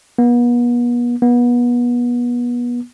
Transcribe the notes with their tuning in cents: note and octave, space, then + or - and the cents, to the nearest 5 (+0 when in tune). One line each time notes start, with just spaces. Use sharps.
B3 -40
B3 -30